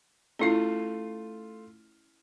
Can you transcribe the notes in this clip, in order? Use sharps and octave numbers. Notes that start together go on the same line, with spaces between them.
A3 C#4 E4 F4 C7